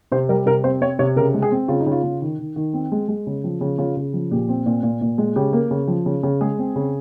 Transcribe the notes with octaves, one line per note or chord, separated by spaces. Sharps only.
C3 C5
G3 A#4
C3 A#4
C4 C5
C4 C#5
C3 C#5
C#3 A#4
G#3
G#4
C4
C#3 F4
D#4
C#3
F4
C#3
D#3
D#3
D#3
C4
G#3
G#3
C#3
F3
C#3
C#3 F4
C#3
F3
A#2 G4
C4
A#2
A#2
A#2
G#3
C#3 G4
A#3
C#3
F3
C#3
C#3
G#3 G#4
C4
C#3